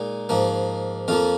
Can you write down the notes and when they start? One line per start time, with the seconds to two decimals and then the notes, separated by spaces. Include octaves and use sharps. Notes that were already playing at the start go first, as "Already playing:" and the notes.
Already playing: A#2 G#3 D#4
0.29 G#2 F3 A#3
1.08 F2 F3 A#3 F4